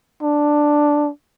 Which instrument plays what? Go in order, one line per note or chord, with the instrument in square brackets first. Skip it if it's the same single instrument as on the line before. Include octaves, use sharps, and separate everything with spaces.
[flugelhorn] D4